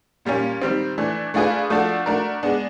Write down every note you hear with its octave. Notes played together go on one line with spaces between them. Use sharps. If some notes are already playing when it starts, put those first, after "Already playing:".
A#2 G3 A#3 C#4
D#3 G3 C4
E3 A3 D4
A3 D4 F4 G#4 B4
F3 A3 D4 F#4 A4
A3 D4 F#4 A#4
G#3 B3 D4